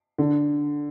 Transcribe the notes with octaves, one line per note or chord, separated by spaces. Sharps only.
D3